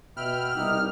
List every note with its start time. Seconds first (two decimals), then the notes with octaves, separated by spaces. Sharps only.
0.17 B2 E5 G5 B5 F6
0.56 C2 D#4 G4